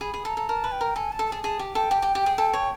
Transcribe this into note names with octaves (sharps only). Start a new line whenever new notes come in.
G#4 B5
G#4
A4 B5
A#5
A4
A#4 A5
B4
G5
A#4
A4 G#5
A5
A4
A5
G#4
G#4 A5
G4
A4 G5
G4
G4
G4
G#4
A4
C#5